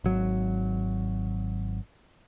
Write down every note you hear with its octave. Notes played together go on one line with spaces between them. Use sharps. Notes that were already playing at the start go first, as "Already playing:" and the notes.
G#1 F#3